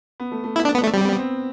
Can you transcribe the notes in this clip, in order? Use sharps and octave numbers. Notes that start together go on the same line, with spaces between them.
B3
A3
A3
B3 E4
D4
B3
A3 D4
G3 C4
B3
C4